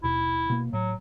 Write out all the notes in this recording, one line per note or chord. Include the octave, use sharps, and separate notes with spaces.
D#2 B2 E4
B2 A#3
A2 F#3